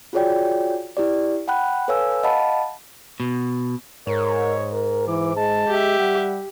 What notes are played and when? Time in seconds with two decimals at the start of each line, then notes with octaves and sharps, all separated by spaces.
0.13 F4 F#4 G#4 C#5 D5 G5
0.97 E4 G4 D5
1.48 F#5 G5 B5 F#6
1.88 A4 B4 C#5 F5 G#5 E6
2.23 D#5 F5 F#5 A5 B5
3.20 B2
4.07 G#2 A#4 C#5
4.72 A#4
5.08 E3 D6
5.37 G#3 A5
5.67 G4 E5
5.99 G3 F#5